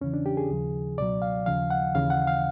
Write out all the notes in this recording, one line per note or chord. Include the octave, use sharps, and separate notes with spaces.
E2 C#3 E3 C#4
D4
G4
G#4
D#2 C#3 F3
C#2 B2 F#3 D5
F5
D#2 C#3 F3 F5
F#5
D#2 C#3 E3 F5
F#5
F5